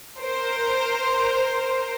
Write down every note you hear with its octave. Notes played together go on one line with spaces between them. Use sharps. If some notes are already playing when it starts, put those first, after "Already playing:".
A#4 C5